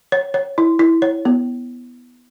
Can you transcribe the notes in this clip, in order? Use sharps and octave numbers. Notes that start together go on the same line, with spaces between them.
C#5
C#5
E4
E4
C#5
B3